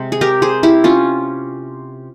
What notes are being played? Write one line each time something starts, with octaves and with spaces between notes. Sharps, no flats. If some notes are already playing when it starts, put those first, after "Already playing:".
Already playing: C3 G#3 C5
G#4
G4 A#4
G#4 C5
E4 G4
C#4 F4